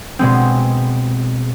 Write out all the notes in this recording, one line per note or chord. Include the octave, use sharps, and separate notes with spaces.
B2 G#3 C4